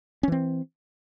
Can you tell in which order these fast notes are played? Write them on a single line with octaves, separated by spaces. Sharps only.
C#4 E3 C4